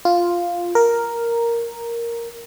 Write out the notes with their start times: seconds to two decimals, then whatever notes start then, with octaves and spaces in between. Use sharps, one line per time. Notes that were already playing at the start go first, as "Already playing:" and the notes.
0.05 F4
0.75 A#4